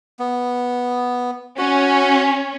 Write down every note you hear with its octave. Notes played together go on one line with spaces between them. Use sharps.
B3
C#4 F#4